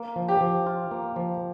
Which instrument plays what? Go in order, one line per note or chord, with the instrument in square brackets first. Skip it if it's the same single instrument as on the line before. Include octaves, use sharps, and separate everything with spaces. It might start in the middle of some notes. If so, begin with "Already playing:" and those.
Already playing: [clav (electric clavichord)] A#3
F3
[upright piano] G4
[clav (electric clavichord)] F3
F4
A#3
F3